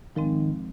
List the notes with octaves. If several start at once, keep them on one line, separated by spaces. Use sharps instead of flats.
G#2 D#3 F3 G#3 C4